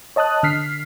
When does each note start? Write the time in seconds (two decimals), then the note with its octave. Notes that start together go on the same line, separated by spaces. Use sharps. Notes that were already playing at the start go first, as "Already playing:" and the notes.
0.16 C#5 D#5 A5 D#6 F#6
0.43 D3 F6 B6 C7